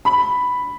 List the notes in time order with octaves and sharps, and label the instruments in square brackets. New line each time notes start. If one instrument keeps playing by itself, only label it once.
[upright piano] B5